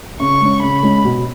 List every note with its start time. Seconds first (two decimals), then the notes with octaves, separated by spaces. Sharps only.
0.20 C#3 C#6
0.41 G#3 C#4
0.62 C#3 B5
0.83 G#3 C#4
1.05 B2